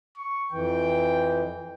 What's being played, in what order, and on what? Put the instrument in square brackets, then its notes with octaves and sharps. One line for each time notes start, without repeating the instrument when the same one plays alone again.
[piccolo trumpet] C#6
[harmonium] F2 E3 [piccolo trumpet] G5